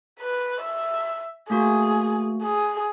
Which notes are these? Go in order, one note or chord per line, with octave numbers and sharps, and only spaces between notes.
B4
E5
A3 A#3 F#4 G#4
G#4